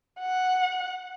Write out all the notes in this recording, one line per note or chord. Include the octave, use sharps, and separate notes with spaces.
F#5